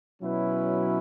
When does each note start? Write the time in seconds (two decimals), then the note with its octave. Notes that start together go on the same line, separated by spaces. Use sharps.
0.21 B2 F#3 C#4 E4 B4